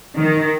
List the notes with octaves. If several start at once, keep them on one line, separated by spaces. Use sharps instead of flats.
D#3